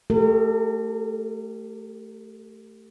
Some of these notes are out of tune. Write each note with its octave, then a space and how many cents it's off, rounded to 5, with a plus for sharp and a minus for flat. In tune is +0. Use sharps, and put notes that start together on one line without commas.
A3 +0 G4 +0 A#4 -40